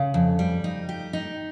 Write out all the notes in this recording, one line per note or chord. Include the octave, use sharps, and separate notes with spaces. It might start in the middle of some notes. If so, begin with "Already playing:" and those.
Already playing: C#3
F2
G3
D#4
G4
D#4